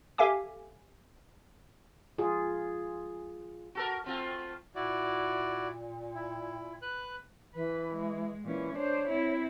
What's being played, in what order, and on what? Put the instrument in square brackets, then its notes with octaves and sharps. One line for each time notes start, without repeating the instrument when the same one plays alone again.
[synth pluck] G4 A4 E5 F5 G#5 D6
[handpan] F4 G#4
[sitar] F#4 A4 A#4
A3 C4 F4
[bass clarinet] A#2 [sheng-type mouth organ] E4 F#4 D5
[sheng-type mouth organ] E4
B4 F#6
[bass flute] E3 [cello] B4
[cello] G#3
[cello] A#2 C#4 [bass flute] E3
[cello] D4 C5 [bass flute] C#5
[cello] C4 E4